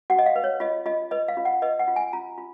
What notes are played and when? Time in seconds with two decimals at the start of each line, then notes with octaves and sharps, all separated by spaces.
0.10 F#4 F#5
0.18 D#5
0.26 F5
0.36 B4
0.44 C#5
0.60 F4 D#5
0.86 F4 D#5
1.11 B4 D#5
1.28 F5
1.37 F4
1.45 F#5
1.62 B4 D#5
1.79 F#5
1.88 F4
1.96 G#5
2.13 F4 A#5
2.38 F4